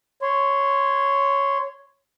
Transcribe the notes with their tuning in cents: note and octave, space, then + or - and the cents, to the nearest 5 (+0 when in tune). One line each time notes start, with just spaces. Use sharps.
C#5 +0 C6 -15